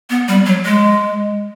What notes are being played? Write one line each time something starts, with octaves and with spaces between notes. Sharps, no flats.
B3
G3
F#3
G#3